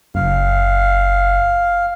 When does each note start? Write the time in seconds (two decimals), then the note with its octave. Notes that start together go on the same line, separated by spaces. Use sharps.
0.15 F#1 F5